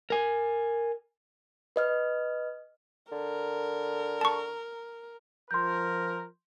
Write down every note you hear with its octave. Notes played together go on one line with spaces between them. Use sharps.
A#4 G#5
B4 D#5 F6
D3 A#4
A5 C#6
F3 A#4 C6 G6